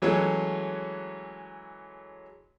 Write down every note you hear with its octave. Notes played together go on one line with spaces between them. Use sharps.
E3 F#3 G#3 A3 C#4